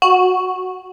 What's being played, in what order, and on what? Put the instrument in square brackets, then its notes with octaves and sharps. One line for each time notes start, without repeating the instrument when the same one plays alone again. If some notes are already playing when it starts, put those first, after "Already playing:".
[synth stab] F#4